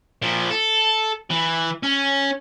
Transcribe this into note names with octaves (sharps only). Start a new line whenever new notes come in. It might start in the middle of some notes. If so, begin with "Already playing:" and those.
A#2 F3
A4
E3
C#4